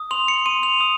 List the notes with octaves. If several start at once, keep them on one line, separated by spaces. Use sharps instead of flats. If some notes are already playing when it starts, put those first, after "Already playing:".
Already playing: D#6
C6 F7
C#7
C6 D#7
F7
D#6